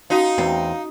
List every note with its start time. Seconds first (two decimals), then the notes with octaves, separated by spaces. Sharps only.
0.10 C#4 D#4 F#4 F5 A5
0.38 E2 C4